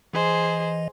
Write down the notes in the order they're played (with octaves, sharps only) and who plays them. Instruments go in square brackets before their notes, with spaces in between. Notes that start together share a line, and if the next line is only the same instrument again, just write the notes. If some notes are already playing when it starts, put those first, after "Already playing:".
[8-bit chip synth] E3 D#5 [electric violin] G#4 C5